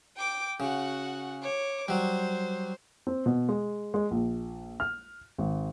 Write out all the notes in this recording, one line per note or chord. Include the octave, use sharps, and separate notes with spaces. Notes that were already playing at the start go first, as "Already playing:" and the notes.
G5 D6
C#3 F#4 F#5
C#5 D6
F#3 G3 C5
C4
B2
G#3
G#3
A#1
F6
G#1